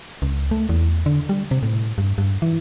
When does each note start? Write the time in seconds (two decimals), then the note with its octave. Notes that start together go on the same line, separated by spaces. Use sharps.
0.22 C#2
0.51 A3
0.69 E2
1.06 D3
1.29 G3
1.51 C3
1.63 A2
1.98 G2
2.18 G2
2.42 E3